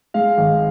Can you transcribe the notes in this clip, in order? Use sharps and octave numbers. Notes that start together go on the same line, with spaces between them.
G#3 F5
G#1